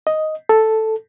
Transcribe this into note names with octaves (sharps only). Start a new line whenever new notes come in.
D#5
A4